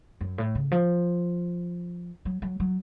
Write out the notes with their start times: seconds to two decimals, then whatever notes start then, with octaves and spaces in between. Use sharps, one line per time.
0.21 F#2
0.38 A2
0.55 C#3
0.72 F3
2.25 F#3
2.42 F#3
2.60 F#3